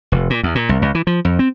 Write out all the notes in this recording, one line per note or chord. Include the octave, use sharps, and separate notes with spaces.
F1
A#2
E2
A#2
C2
C#2
E3
F3
F2
C4